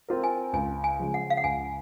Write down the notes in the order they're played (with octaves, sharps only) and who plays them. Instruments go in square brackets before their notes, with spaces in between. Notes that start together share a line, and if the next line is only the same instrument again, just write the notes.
[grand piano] C4 F4 A#4
[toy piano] G#5
[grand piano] C#2 [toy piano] G#5
[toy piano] G#5
[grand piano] C#3 F3 G#3
[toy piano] F#5
F5
F#5
[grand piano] C#2 [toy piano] G#5